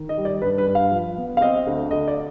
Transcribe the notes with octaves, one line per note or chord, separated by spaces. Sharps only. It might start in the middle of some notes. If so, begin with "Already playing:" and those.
Already playing: D#3
D#5
G3
D5
G2 B4
B4
G2
F5
F3
B3
F5
C4 D#5
D2
D3 D#5
D5